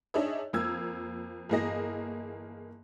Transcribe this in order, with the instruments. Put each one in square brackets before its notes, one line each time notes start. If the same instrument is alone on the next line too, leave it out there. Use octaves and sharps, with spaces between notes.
[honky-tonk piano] D4 D#4 G#4 C#5 D#5 E5
F2 A#3 E6 G#6
G1 E3 A#3 G#4 D#5 A#6